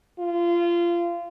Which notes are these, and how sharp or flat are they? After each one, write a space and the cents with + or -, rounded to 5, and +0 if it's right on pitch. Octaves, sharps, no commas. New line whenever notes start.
F4 -25